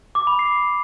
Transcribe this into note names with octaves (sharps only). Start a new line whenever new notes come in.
D6
B5
C7